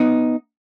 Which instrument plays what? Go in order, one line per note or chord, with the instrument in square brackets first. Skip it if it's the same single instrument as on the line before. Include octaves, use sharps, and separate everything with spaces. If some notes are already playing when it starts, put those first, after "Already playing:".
Already playing: [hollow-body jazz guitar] B3 D#4